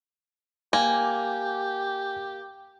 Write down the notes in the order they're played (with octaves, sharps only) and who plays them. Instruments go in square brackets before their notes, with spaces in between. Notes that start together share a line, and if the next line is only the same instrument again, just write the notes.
[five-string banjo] A#3 [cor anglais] G4 [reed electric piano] G#5